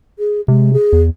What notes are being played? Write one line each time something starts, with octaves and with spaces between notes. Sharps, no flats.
G#4
C3 G#3
G#4
E2